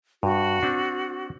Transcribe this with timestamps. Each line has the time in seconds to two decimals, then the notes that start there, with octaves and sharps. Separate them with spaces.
0.23 G2 F#4
0.63 C4 D4